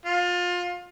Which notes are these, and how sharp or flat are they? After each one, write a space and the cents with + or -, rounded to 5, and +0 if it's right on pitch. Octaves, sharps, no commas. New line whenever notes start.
F4 +25